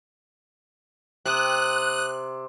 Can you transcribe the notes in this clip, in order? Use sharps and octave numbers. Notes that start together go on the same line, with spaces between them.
C3 D#6 F#6